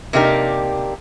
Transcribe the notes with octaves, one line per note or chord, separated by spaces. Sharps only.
C3 A#3 D4 D#4 G4 A#4